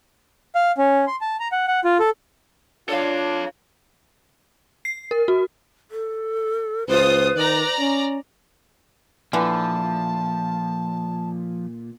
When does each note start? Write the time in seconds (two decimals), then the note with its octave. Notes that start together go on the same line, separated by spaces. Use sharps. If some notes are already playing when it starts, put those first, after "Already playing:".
0.55 F5
0.78 C#4
1.07 C6
1.21 A5
1.40 A#5
1.52 F#5
1.67 F#5
1.84 F4
2.00 A4
2.89 D4 F4 A4 C#5 F5
4.85 C7
5.11 A#4
5.28 F#4
5.91 A4
6.88 C#2 F4 B4 C5 D#6
7.36 D#3 D5 A#5
7.80 C#4
9.33 A#2 D3 E3 F3 A5